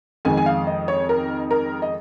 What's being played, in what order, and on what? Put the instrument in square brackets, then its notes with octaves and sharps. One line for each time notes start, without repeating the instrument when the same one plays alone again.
[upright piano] F2 D#3 G#3 G#5
G#5
F5
D#5
C#5
A#4
A#4
D#5